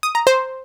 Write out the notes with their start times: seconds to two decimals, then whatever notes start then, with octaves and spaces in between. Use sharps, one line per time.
0.03 D#6
0.15 A#5
0.27 C5